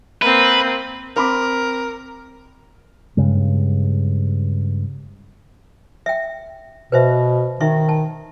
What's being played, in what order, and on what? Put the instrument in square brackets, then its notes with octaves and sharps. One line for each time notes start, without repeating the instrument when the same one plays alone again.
[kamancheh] A#3 C4 [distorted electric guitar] B4
[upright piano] C4 B5 D6 [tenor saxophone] A#4
[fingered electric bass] G2 C#3 G#3
[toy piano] E5 G5
[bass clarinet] B2 [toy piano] B4 C5 E5
[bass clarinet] D#3 [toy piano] D#4 E5 C#6
[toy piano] A5